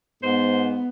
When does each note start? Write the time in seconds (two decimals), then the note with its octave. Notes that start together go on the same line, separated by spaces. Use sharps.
0.23 G#2 B3 C5